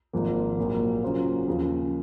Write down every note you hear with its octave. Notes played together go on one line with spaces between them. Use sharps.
G#1 G#2 F3 A#3
A#1 A#2 F#3 A#3
C#3 F#3 A#3 F4 C5
D#2 C#3 F3